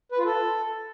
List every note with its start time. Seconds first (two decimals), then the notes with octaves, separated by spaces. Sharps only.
0.12 B4
0.18 F4
0.25 A4